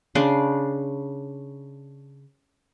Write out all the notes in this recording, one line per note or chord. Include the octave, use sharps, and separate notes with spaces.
C#3 D4 D5 C6